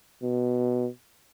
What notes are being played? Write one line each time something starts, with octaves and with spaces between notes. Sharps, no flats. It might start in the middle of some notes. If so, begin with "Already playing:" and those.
B2